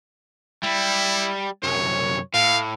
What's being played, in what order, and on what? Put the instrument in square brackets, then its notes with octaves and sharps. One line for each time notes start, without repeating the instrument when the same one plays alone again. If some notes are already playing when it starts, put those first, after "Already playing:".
[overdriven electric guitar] G3 [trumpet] E4
[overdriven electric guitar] C2 F#2 [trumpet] C#5
[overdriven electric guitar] A2 [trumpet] F5